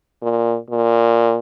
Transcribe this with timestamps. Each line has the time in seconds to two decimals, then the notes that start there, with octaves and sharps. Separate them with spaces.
0.22 A#2
0.71 A#2